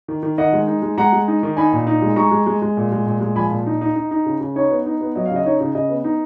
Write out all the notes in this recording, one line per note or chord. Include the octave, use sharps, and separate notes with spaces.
D#3
D#3
D#3 D#5 F#5
G#3
D#4
G#3
G#3 F#5 A#5
G#3
D#4
D#3
D#4 G#5 B5
A#2
D#4
G#3
G#3 A#5 C#6
G#3
G#3
G#3
A#2
G#3
A#2
G#3
F3 G#5 B5
A#2
D#4
D#4
D#4
D#4
C#3
C#3
D#4 C#5
B3
D#4
B3
F#3 D#5
F5
C#3
D#5
D#4 C#5
C#3
C#3 D#5
B3
D#4